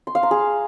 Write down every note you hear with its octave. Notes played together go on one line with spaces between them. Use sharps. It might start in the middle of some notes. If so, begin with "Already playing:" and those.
C6
F5
A#5
G#4